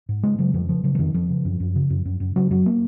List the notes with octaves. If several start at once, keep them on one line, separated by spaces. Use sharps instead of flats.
G#2
C#3 G#3
C#3 F#3
F2 F3
C#3 F3
C#3 F#3
F3
F2 D#3
F2 F3
C#3
F#2
F#2
C#3
F#2
F#2
F#2
C#3 F#3
F#2 F#3
A#3